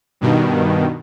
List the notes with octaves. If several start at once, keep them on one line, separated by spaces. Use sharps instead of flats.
G2 B2 D#3